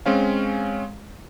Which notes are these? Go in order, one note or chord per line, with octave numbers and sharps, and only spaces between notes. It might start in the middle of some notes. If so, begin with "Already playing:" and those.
G#3 C4 C#4 F5